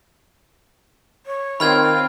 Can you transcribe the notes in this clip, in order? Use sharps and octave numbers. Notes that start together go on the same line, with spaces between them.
C#5
D#3 C4 F4 B5 F6 G#6